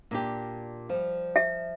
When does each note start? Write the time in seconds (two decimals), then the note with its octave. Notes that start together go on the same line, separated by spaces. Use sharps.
0.11 A#2 D4 G4
0.89 F3 G3
1.36 E5